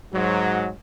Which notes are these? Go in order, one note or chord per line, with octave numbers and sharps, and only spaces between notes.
G#2 F#3